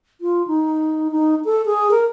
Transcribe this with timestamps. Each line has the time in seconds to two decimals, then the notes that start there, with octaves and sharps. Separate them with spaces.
0.21 F4
0.47 D#4
1.12 D#4
1.45 A4
1.66 G#4
1.91 A#4